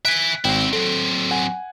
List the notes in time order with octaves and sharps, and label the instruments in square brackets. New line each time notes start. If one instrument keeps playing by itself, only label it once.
[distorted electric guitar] E5 G#5 [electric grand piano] F#6 B6 D7
[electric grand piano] G#1 G5 [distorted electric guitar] C4 E4
[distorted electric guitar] F#3 C4 [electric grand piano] A4
[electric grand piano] F#5 G#5